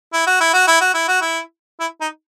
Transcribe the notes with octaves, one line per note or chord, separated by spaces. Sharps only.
E4
F#4
E4
F#4
E4
F#4
E4
F#4
E4
E4
D#4